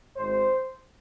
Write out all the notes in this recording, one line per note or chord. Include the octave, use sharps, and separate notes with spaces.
G#1 G#2 G#3 C5